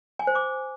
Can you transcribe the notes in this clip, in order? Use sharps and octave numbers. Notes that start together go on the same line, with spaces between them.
G#5
C5
D6